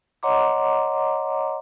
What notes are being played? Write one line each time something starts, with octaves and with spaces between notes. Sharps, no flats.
C#5 D#5 F#5 A#5 C6 D6